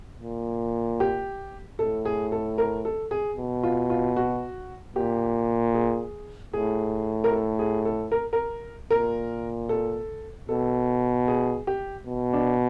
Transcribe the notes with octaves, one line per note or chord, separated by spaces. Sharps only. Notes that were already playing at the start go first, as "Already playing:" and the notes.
A#2
G4
A2 A4
G#4
A4
A#4
A4
G#4
B2
F4
F4
F#4
A#2 G4
G#4
A2 G#4
A#4
A4
G#4
A4
A#4
A#4
A#2 A#4
A4
B2 A4
G#4
G4
B2
D4